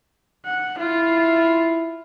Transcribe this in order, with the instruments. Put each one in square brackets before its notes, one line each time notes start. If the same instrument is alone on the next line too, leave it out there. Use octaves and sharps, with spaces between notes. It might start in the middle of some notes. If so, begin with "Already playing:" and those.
[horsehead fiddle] F#5
[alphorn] E4 [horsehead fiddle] F4